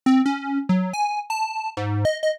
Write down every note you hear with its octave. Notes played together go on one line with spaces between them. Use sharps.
C4
C#4
F#3
G#5
A5
G#2
D#5
D#5